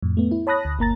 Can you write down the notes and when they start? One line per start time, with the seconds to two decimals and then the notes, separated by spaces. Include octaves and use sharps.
0.03 F2 A2
0.17 A3 B3
0.31 E4
0.47 C#5 A5 B5 D#6 F#6 A#6
0.65 D2
0.79 G1 A#3 A#5 A6